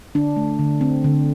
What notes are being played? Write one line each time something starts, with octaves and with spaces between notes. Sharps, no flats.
D3 D4
A3
D3
C4
D3